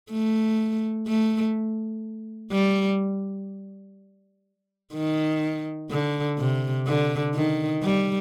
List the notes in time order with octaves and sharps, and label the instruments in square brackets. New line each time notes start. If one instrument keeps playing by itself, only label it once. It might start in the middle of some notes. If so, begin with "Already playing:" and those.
[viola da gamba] A3
A3
G3
D#3
D3
C3
D3
D#3
G3